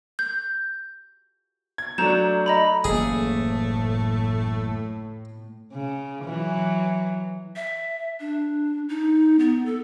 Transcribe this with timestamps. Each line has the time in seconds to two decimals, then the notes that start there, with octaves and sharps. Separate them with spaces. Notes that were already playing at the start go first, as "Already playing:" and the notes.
0.19 G6
1.78 G#6
1.98 F#3 A3 D4 A#5 G6 E7
2.46 D#5 A#5 B5
2.84 F#1 A2 E3 A3 A#3 G#4
5.72 C#3
6.25 E3 F#3
7.56 E5
8.20 D4
8.89 D#4
9.39 B3
9.66 A4